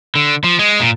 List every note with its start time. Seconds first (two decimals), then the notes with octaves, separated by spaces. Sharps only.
0.15 D3
0.44 F3
0.59 G#3
0.80 A#2